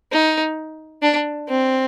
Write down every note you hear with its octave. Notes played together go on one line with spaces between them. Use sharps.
D#4
D4
C4